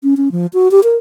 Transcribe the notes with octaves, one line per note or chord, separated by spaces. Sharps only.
C#4
C#4
F3
F#4
G4
A#4